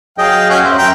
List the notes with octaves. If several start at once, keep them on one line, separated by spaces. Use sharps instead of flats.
F#3 G#4 D#5 F5 G5
C#4 F#4 F#6 G6
F#2 C5 E5
F#2 G5 A#5